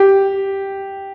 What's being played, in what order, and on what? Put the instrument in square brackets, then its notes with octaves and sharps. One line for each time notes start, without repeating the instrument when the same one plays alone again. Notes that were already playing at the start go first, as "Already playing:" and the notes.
Already playing: [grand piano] G4